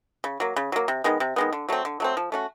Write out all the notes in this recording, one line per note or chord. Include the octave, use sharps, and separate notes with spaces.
C#3
F#3 A#3
C#3
F#3 A#3
C3
D#3 G#3 B3
C3
D#3 G#3 B3
D3
F#3 A3 C4
D3
F#3 A3 C4
F3
A3 C#4 F#4